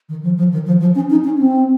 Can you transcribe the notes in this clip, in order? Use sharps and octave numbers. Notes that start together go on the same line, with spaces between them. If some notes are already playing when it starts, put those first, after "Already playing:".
D#3
F3
F3
D#3
F3
F3
C#4
D#4
C#4
C4